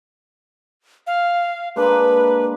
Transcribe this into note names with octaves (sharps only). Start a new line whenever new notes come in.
F5
G#3 A#3 D4 B4